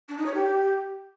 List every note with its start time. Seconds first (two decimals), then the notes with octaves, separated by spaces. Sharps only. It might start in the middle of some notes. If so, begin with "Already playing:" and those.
0.09 D4
0.17 D#4
0.26 C#5
0.34 G4